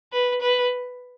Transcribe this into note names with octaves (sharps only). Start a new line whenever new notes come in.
B4
B4